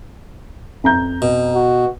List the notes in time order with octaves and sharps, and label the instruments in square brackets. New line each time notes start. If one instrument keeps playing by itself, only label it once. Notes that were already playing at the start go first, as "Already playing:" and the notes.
[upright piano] F2 A#5 G6
[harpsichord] B2
[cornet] F#4